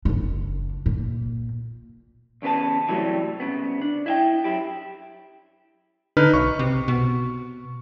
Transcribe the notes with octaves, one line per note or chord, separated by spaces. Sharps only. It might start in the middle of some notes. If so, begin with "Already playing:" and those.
F#1 D4
A#2
E2 C#3 B3 B4 A5
C3 E3 F#3 G3 A3
C2 G2 C#3 B3
D4
E4 E5 G5
F#2 E4 G4
D3 D#4 B4 F6
B1 C#6
C3
B2